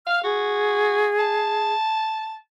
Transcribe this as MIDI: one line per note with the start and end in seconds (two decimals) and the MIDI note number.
0.07 0.21 77
0.07 0.20 89
0.24 1.11 66
0.24 1.74 68
1.19 2.35 81